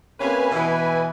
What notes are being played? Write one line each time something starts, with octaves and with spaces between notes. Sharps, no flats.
C3 A#3 C#4 B4 G#5
B2 E3